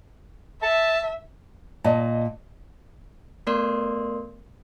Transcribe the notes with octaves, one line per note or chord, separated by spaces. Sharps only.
E5 A5
A#2 D5 D#5 A5
A3 B3 A#4 D5 C6